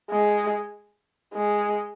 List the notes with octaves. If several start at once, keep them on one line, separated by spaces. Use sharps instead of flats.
G#3
G#3